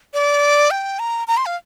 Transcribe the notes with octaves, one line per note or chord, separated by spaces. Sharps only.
D5
G5
A#5
A#5
C6
F5